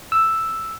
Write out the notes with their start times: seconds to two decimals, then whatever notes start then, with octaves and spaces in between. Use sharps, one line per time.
0.12 E6